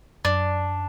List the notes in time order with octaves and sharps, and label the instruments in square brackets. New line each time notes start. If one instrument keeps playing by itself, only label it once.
[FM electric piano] F#2 [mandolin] D4